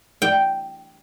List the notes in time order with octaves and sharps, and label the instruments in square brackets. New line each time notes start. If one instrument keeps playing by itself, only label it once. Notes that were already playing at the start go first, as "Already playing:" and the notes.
[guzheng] G5